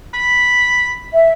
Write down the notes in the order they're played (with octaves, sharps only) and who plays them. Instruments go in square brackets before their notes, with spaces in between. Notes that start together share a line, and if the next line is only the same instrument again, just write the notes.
[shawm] B5
[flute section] E5